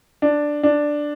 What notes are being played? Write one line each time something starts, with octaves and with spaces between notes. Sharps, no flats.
D4
D4